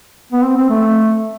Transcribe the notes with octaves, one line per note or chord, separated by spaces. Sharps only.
B3
C4
C4
A3